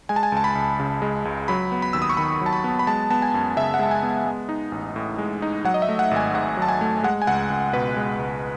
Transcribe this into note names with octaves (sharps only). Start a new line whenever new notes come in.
G#3 G#5
A5
G#5
C#2 A5
B5
C#2
C#3
G#3
C#2
F#3 B5
B3
B5
D#2 E6
D#6
C#6
D#3 B5
F#3 A5
B5
B3
B5
G#3 A5
B3 A5
G#5
F#2
C#3 E5
F#5
G#3 A5
G#5
B3
G#3
D#4
A1
A2
G#3
D#4
F#3 F#5
D#5
E5
A3
F#5
G#1
G#5
G#2 F#5
F#3 A5
G#5
A3
G#3 F#5
G#5
C#2 F#5
C#2
B2 B4
G#3
C#2